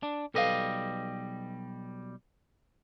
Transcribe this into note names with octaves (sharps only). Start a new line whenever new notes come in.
D4
B1 G3 A4 B4 D#5 F5